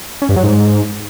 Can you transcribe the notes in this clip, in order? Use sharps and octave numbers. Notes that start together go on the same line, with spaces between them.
C#4
G2
F#3
G#2